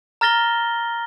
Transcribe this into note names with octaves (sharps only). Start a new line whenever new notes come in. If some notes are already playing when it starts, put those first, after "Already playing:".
A#5 F6 A6 A#6 G7